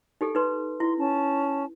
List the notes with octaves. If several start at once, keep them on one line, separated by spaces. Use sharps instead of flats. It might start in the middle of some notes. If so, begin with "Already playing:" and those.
D#4 G4 A4
D#4 B4 C6
E4 C6
C#4 A5